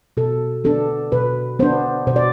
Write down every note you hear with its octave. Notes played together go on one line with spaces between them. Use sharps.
B2 A4
B3 D4 A4
B2 B4
B3 D4 C5
B2 C5
D5